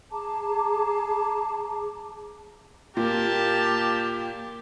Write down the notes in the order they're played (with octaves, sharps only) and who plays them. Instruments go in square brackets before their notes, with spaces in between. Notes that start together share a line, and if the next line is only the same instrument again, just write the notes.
[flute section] G#4 A5 A#5 D6
[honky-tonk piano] A#2 [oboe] G4 [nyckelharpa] A#4 [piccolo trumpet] A5